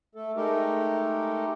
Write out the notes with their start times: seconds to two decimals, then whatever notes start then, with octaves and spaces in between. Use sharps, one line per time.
0.15 A3 A4
0.36 G#3 A3 D#4 G4 A4 A#4